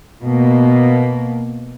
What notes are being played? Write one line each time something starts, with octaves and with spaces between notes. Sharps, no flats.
B2 A#3